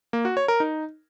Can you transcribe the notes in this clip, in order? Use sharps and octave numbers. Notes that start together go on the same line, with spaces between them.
A#3
F#4
C#5
A#4
D#4